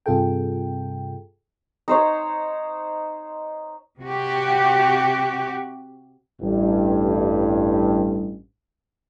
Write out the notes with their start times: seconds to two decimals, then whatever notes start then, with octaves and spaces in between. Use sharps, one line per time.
0.06 G2 C3 F4 G#4 A4 G5
1.88 D#4 C5 C#5
4.00 C3 F#4 G4
6.42 A1 G2